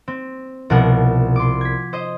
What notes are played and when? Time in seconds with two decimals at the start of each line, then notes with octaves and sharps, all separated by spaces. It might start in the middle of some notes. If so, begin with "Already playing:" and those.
0.08 C4
0.70 C2 B2 F3 A#4 F#5
1.36 C6 D6
1.61 G#6 B6
1.93 C5 D#5